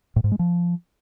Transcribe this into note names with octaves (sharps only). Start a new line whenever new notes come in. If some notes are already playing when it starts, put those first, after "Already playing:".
A2
G#2
G#3
F3